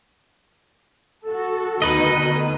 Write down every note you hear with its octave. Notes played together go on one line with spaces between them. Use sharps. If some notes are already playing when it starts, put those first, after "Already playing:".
F#4 A4
D2 B2 D#3 D#4 B4 D#5